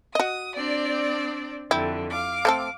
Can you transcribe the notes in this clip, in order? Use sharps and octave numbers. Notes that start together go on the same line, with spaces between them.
F#4 D#5 D#6
C4 D4 D5
F2 D3 E4 G4
F5 D6
A3 C4 A4